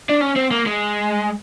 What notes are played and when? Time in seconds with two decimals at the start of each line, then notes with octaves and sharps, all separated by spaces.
0.09 D4
0.21 C#4
0.36 C4
0.51 A#3
0.66 G#3